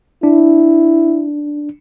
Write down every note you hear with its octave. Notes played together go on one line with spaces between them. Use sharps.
D4 E4